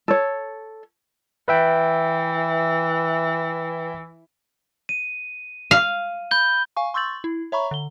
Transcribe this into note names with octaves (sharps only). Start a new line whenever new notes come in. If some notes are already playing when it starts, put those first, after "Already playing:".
A4 C#5
E3 B4 E5 G5
D#7
F5
B5 G6 G7
F5 G#5 C#6
C6 C#6 E6 G6 A6 F#7
E4
C#5 E5 A#5 B5 C#6
D3 G7